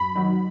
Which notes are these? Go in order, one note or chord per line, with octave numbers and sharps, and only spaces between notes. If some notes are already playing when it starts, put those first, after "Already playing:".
Already playing: F#2 B5
D#3 F#3